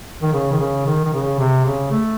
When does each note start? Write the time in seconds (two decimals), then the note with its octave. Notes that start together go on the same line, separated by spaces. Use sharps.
0.22 D#3
0.33 C#3
0.52 D#3
0.60 C#3
0.86 D#3
1.05 D#3
1.13 C#3
1.39 C3
1.66 C#3
1.91 A3